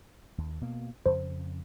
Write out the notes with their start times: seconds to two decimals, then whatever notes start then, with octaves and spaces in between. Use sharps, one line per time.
0.38 D#2
0.61 B2 A#3
1.06 F2 C#3 C5